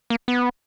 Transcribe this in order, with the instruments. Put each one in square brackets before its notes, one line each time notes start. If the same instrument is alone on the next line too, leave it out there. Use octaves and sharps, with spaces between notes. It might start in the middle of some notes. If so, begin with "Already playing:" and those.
[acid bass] A#3
B3